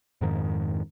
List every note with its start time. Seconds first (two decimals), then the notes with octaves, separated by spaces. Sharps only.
0.21 F2 G#2 D#3